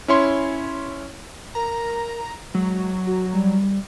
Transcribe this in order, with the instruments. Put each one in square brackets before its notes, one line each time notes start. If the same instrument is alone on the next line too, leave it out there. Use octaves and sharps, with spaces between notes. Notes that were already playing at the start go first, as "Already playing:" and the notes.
[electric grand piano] C#4 E4 C#5 C6
[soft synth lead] A#4 [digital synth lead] A#5
[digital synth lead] F#3 [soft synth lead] G#3
[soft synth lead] F#4
G3